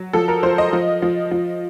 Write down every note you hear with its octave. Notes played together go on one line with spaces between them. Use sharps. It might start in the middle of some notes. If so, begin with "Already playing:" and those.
Already playing: F#3
F3 A4
A#4
F3 C5
D#5
F3
F3
F3